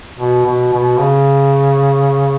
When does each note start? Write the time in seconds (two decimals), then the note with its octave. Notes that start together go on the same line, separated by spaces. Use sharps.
0.18 B2
0.45 B2
0.73 B2
0.99 C#3